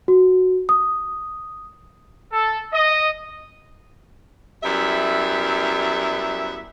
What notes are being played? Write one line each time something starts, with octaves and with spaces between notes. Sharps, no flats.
F#4
D#6
A4
D#5
F#2 G3 B3 E4 E5